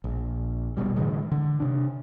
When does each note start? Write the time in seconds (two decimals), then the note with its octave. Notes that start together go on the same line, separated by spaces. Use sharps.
0.04 A#1
0.77 E1 B1 B2 G3
0.96 A2 D3 E3 G#3
1.31 D3
1.60 C3 D4